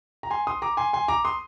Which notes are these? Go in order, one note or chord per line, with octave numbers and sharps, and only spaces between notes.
A#5
G#5 C6
C6 D#6
A#5 D6
G#5 C6
G#5 C6
A#5 D6
C6 D#6